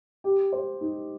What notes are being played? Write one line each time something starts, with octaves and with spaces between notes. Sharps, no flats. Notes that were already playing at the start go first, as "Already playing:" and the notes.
G4
C5
D#4